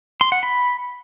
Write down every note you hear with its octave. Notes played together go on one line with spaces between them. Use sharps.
C6
F#5
B5